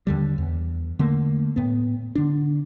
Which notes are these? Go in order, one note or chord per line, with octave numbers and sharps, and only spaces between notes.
D#2 D3 G3
E2
D3 A3 A#3
A2 B3
D3 D4